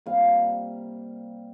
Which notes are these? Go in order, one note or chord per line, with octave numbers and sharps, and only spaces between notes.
C3 G3 A#3 F5